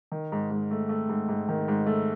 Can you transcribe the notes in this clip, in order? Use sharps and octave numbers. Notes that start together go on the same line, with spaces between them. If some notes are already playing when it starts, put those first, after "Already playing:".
D#3
G#2
G#2
A3
A3
G#2
G#2
D#3
G#2
A3